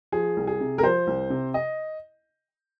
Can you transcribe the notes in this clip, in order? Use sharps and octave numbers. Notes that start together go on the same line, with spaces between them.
F3 G#4
C2
G#4
C3
A#4
F3 C5
C2
C3
D#5